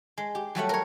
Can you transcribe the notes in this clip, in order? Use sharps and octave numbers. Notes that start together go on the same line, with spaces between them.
G#3
G4
F#3 G3 A3 F#5
A#4 C#5